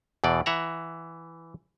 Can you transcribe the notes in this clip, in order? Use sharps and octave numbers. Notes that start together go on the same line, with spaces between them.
E2 B2 E3 D5
E3 E5 F#5 A#5